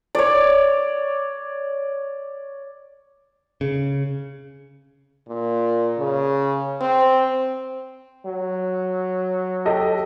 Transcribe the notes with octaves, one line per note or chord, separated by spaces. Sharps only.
C#5 D5
C#3
A#2
C#3
C4
F#3
G4 A4 D#5